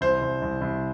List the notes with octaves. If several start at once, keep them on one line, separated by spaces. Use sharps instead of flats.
C2 C5
C2
C2
C2